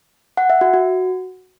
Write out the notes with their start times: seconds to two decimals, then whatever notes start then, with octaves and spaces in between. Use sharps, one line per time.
0.37 F#5
0.50 E5
0.61 F#4
0.74 F#4